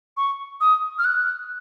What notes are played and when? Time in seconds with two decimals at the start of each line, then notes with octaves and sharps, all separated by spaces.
0.17 C#6
0.61 D#6
0.99 F6
1.05 F#6